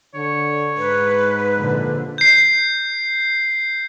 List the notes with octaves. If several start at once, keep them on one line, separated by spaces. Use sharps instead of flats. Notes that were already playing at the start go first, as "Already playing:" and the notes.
D3 C#5
G#2 B4
A#1 D3
G6 C7